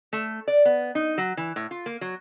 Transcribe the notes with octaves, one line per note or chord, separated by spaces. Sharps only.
A3
D5
B3
D#4
F#3
E3
A2
F4
A#3
F#3